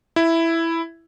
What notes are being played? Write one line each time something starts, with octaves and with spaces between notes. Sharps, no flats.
E4